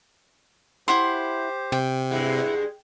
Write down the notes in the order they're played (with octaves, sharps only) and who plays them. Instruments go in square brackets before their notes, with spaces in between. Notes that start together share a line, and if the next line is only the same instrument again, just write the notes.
[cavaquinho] E4 F#5 C6 [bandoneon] G4 C5
[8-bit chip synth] C3 [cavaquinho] G5
[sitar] G2 G#3 [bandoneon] E4 F#5